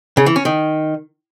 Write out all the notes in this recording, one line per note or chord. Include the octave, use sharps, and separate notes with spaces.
C#3
E3
C#4
D#3